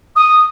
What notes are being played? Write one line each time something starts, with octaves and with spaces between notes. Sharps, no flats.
D#6